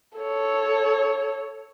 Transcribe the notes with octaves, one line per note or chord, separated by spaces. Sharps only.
A4 C#5